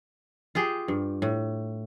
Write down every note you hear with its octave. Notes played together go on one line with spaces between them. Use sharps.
F4 G4 G#4 G5
G2
A2